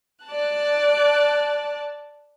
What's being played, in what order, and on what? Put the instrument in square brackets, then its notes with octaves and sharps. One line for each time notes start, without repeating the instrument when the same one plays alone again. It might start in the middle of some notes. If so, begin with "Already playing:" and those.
[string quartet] D5 A5 F#6